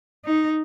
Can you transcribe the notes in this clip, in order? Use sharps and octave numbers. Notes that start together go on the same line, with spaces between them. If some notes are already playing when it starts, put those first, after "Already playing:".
D#4